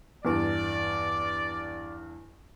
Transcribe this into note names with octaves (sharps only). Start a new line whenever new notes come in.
E2 G2 D5